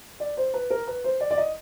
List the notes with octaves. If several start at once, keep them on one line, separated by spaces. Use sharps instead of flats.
D5
C5
B4
A#4
B4
C5
D5
D5
D#5